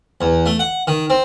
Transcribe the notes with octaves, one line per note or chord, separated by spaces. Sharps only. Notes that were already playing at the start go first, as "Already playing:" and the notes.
E2
A3
F#5
D#3
C4